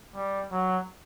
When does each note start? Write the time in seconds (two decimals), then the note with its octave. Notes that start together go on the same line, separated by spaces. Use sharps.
0.15 G3
0.51 F#3